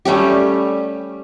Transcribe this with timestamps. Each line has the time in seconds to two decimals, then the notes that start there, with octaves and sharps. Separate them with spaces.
0.05 G3 A3 C#4 G4